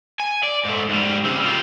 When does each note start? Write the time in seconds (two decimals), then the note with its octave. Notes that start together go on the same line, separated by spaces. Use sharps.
0.20 G#5
0.43 D5
0.65 G#2 A3
0.89 G#2 G3
1.24 C#3 C4
1.41 G3 F4